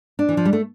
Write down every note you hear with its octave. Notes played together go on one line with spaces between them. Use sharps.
D4
E3
F3
G3
A3